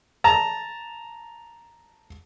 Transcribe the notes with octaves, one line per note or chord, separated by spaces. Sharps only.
A5 A#5